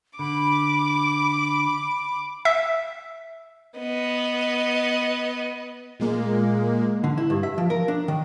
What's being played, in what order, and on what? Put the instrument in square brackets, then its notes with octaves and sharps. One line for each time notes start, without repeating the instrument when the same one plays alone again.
[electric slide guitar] D3 [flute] B5 [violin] D6
[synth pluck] E5
[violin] B3 D#5
[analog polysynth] A#2 G#3 A#3
[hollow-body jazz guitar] D3
E4
G2
E5
F3
A#4
D4
D#3